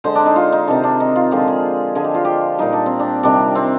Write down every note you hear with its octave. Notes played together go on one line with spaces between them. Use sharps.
D3 G#3 C5
D4
D#4
F4
D#4
C3 D#3 G#3 D4
D4
D#4
F4
D3 F3 G#3 G4
G#4
D3 F3 G#3 G#4
G4
F4
G4
A#2 G3 D#4
D4
C4
D4
C3 D#3 G3 D4
C4